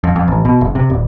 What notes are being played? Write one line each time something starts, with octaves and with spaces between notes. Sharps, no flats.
F2
F2
A1
B2
F#1
C3
D#1